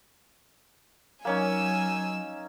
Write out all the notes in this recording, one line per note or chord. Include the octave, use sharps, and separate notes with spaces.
F#3 A#3 C#4 D#4 G#5 E6